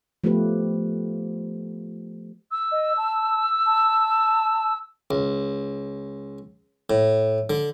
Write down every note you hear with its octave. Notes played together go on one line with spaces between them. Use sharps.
F3 A3 B3 F4 G4 B4
E6
D#5
A5
A5
C#2
A2
D3